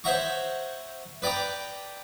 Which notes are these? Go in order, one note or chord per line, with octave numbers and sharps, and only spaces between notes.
C5 C#5 E5 F#5 A#5 C#6
B4 D5 G5 A#5 D6